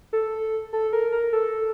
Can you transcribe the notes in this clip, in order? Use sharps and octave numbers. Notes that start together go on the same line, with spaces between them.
A4
A4
A#4
A#4
A4